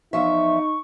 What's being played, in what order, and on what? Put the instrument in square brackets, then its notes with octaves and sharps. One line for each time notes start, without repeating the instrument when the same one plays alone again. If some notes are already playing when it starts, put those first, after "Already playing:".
[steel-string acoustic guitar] E2 F3 E5 [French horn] D#4 [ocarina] C#6